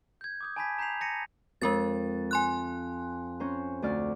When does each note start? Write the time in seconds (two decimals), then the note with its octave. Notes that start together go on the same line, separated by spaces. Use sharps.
0.21 G6 G#6
0.41 D6 D#6 G6
0.56 G#5 A5 B5 G6 G#6 B6
0.79 A#5 G6 B6 C7 F7
1.01 A5 A#6 C#7 D#7
1.61 F2 G#3 A#4 A6
2.31 G#5 C6 F#6
3.40 C#4 C5 A#5
3.82 D2 D5 F6